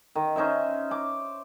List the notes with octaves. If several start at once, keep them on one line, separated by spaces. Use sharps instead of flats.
D#3
C#4 D#4 C5 E5
D6